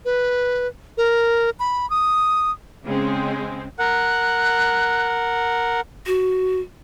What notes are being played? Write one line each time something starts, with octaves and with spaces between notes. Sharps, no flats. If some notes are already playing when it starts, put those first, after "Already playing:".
B4
A#4
B5
D#6
C#3 G#3 C4
A#4 F#5 F#6
F#4